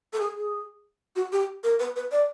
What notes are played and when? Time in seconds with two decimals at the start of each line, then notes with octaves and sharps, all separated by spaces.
0.13 A4
0.20 G#4
0.35 G#4
1.16 F#4
1.32 G4
1.63 A#4
1.79 B4
1.96 B4
2.12 D5